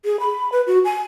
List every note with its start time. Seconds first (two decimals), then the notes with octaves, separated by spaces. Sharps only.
0.05 G#4
0.20 B5
0.52 B4
0.67 F#4
0.85 G#5